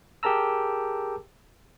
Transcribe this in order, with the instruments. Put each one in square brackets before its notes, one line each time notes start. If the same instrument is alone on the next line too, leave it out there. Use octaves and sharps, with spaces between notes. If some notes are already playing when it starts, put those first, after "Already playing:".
[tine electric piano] G4 G#4 A#4 A5 A#5 E6